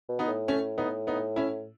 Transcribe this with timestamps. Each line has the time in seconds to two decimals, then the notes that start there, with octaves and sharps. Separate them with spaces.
0.09 B2
0.19 B3 D#4
0.29 A2
0.48 A3 C#4
0.78 B3 D#4
1.07 B3 D#4
1.36 C#4 E4